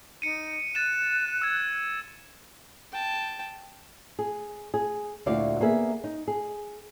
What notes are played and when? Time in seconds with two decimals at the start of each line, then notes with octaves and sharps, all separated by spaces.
0.22 D#4 C#7 D#7
0.75 F#6 A6 D#7 E7
1.42 E6 G#6
2.92 G5 A5
4.19 G#4
4.74 G#4
5.26 D2 A#2 E4 F#4 D5 F5
5.61 A#3 B3 G#4 E5
6.04 D#4
6.28 G#4